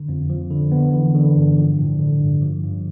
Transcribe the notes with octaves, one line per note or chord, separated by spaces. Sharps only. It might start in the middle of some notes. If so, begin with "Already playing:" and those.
Already playing: D3
F2
F3
D3
B3
E3
D3
G2
F3
A2
D3
G2
F3
G2